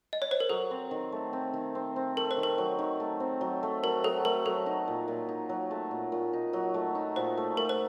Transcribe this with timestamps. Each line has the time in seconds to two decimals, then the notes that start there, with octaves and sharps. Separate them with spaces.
0.13 D#5
0.22 C#5
0.31 C5
0.40 A#4
0.49 F#3 A4
0.71 C4
0.91 D#3
1.12 A3
1.33 C4
1.53 D#3
1.75 C4
1.96 C4
2.17 A3 A#4
2.31 C5
2.37 D#3
2.43 A#4
2.58 F#3
2.79 D#3
3.00 A3
3.20 C4
3.41 F#3
3.63 A3
3.83 F#3 A#4
4.04 F#3 A4
4.25 A3 A#4
4.45 F#3 A4
4.66 D#4
4.88 A#2
5.08 A#2
5.29 D#4
5.49 F#3
5.71 A3
5.91 A#2
6.12 A#2
6.33 D#4
6.53 F#3
6.74 A3
6.95 D#4
7.16 A#2 C5
7.37 A3
7.57 A3 A#4
7.69 C5